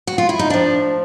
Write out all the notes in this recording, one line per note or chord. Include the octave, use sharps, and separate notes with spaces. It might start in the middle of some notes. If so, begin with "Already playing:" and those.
F#4
F4
E4
D#4
A2 F3 D4